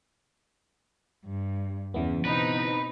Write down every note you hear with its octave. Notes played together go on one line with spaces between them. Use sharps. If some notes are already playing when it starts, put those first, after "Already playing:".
G2
E2 C#3 E3 B3
B2 C4 D#4 B4